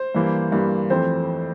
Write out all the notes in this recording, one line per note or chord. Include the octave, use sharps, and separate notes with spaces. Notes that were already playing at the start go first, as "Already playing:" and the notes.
Already playing: C5
G2 E3 A#3
G2 E3 A#3
F2 E3 A3 C4 C5